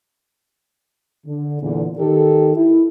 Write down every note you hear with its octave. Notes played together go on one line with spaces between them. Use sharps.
D3
E2 A#2 D3
D#3 G4 A4
E4